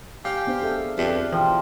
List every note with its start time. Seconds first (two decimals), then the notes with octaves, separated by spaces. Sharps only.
0.25 G4 F5 G#5
0.47 B3 D4 C5
0.62 G#4 A4 E5
0.98 F2 G4 B4 D5 E5
1.32 B2 E3 F3 G5